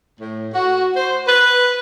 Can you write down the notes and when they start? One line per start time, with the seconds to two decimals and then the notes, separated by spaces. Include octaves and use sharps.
0.20 A2
0.54 F#4
0.96 C5
1.28 B4